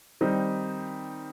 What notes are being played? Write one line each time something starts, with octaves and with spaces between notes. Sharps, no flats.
D#3 G3 C4 D#4